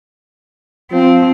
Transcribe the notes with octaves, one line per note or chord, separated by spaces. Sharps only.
F3 C4